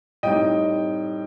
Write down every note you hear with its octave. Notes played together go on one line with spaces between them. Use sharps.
A2 G3 C4 D#4 D#5 G5